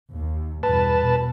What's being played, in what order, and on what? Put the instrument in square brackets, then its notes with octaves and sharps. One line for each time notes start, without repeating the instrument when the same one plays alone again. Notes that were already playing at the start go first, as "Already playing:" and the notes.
[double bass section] D#2
[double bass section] E2 G2 B2 [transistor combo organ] B4 A5
[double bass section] B2